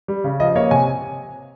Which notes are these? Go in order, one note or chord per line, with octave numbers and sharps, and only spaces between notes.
G3
C#3
F3 D#5
A#3 C#5
C3 G#5